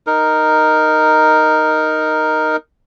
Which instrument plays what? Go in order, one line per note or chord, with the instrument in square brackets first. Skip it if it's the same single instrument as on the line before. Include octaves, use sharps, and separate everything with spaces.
[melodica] D#4 A#4